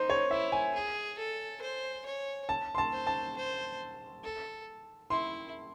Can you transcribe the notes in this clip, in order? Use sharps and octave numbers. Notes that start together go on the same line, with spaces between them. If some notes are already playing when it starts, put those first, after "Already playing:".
Already playing: D#4 C5
C#5
E4 E5
G#5
G#4
A4
C5
C#5
A5
C6
A5
C5
A5
C5
A4
E4 C6